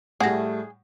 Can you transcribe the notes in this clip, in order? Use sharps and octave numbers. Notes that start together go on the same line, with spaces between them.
A2 G3 A3 G#4 F#5 A#6